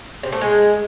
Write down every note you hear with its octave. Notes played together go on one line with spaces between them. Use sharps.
C3
A3
G#3